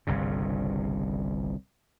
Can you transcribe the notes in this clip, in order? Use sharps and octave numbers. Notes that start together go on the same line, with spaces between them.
G1 C2 G2 C#3